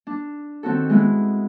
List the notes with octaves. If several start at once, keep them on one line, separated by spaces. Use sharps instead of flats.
D4
D#3 C4 F#4 A4
G#3 B3 E4